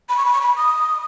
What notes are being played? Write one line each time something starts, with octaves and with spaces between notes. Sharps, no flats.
B5
C#6
B5
C#6
B5
D#6